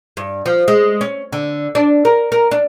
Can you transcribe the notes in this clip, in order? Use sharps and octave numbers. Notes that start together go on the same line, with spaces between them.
G2
F3
G#3
C#4
D3
D4
A#4
A#4
D4